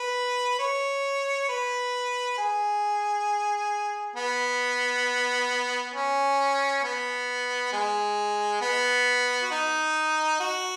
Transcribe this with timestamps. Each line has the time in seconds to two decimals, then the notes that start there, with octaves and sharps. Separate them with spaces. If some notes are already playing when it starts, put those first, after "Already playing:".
Already playing: B4
0.59 C#5
1.49 B4
2.38 G#4
4.16 B3
5.94 C#4
6.84 B3
7.73 G#3
8.61 B3
9.42 F#4
9.51 D#4
10.40 F#4